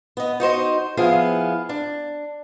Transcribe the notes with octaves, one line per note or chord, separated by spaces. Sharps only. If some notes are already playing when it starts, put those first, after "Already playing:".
B3 D#5
D#4 F#4 C5 D#5
F3 B3 E4 G#4 F5
D4